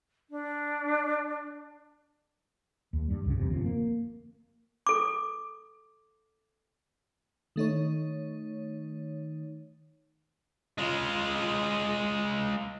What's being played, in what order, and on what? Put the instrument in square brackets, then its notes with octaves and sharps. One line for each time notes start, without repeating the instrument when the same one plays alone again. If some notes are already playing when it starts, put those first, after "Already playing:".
[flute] D4
[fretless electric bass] D#2
G2 G3
C#2 C#3
E2 G2 C3
F#1 D3 F3 C4
A#3
[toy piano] A4 D6
[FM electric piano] D#3 A3 D#4 C#5
[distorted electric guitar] G#3 F4